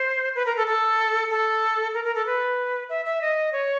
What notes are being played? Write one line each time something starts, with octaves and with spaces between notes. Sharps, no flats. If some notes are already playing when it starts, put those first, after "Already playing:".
Already playing: C5
B4
A#4
A4
A4
A4
A#4
A#4
A4
B4
E5
E5
D#5
C#5